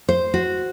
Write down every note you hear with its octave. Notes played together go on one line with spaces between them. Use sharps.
C5
F#4